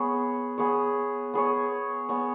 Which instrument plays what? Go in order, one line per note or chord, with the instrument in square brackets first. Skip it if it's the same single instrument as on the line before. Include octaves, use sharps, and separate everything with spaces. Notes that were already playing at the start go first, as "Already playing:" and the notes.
Already playing: [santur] B3 G#4 C#5
B3 G#4 C#5
B3 G#4 C#5
B3 G#4 C#5